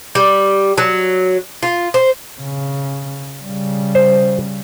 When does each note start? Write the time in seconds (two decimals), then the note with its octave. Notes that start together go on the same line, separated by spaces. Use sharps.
0.15 G3
0.78 F#3
1.63 F4
1.94 C5
2.41 C#3
3.42 C#3 G3
3.95 C5